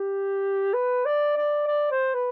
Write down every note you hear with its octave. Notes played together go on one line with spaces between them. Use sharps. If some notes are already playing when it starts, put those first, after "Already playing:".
Already playing: G4
B4
D5
D5
D5
C5
B4